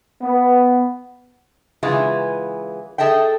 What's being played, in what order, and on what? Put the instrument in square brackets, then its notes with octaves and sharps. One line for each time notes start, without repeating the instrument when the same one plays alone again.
[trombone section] B3
[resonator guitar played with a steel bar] C#3 E3 G#3 B3 F4
G#4 A4 D#5 E5 G5